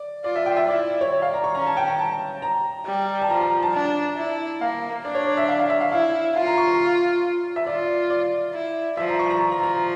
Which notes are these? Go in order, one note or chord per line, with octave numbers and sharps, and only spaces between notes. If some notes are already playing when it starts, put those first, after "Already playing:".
Already playing: D5
F4 D5
E5
G5
E5
E4 D5
C#5
D5
F5
A#5
C#6
C#4 A#5
A5
G5
A#5
A5
A#5
G3
A5
F3 A#5
A#5
A#5
A5
D4
E4
A#3 F5
D4 D5
C#5
D5
E5
F5
F5
E5
F5
E4 F5
F4 F5
A#5
C#6
A#5
E5
F4 D5
D5
E4
F3 E5
A#5
C#6
A#5
F3 C#6
A#5
A#5